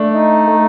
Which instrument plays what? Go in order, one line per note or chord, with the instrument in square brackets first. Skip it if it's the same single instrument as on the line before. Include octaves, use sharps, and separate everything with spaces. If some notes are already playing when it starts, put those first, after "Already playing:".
Already playing: [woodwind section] A3 [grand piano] D4
[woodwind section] D#4
A3